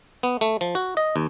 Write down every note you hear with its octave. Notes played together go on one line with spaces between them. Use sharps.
B3
A3
F3
F#4
D#5
D#2